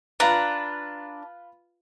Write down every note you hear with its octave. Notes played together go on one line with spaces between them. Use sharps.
D4 F4 B4 A#5